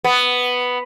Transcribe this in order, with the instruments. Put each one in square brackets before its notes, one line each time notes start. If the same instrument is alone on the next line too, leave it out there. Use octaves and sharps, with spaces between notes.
[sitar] B3